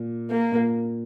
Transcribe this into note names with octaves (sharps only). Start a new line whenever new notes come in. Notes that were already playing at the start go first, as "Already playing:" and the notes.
Already playing: A#2
A#3
A#2